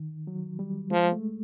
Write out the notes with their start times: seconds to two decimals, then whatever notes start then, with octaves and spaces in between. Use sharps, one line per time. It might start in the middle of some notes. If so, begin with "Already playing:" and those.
Already playing: D#3
0.27 F#3
0.59 G3
0.91 F3 G#3
1.12 A3